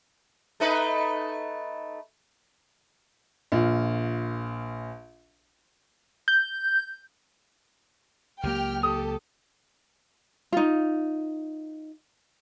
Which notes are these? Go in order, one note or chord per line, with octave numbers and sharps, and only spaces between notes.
A3 D#4 B4
A#1 F4
G6
C#2 F#3 A#3 G4 G5 F6
G4 A4 D#6
D#4 F4